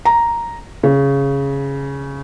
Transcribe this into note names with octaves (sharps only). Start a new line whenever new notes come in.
A#5
C#3